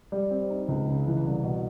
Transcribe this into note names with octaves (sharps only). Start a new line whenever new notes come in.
G3
C4
D#4
C#2
C#3
E3
C2
B2